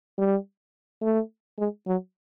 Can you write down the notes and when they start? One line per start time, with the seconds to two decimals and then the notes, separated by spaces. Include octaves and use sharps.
0.18 G3
1.02 A3
1.58 G#3
1.87 F#3